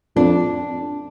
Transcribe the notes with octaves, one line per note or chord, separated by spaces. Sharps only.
F2 D4